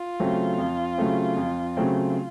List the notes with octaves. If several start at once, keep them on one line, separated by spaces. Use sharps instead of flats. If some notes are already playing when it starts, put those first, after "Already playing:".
Already playing: F4
C#3 F#3 A3 C4
F2
C#3 F#3 A3 C4
F2
C#3 F#3 A3 C4